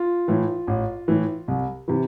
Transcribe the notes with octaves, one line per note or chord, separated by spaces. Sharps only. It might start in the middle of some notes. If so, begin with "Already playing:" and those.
Already playing: F4
A2 E3
A1
A2 E3
C2
C3 E3